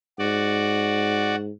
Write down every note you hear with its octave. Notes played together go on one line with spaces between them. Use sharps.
G#2 F#4 D5